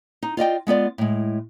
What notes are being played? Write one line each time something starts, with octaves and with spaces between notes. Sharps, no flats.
D#4
F4 D5 D#5 G5
G#3 B3 F4 D5
A2 G#3